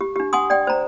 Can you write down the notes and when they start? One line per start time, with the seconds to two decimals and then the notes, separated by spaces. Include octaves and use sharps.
0.01 G4
0.16 D4 G4
0.33 F#5 G#5 C6 D#6
0.50 D5 G5
0.67 C5 A#5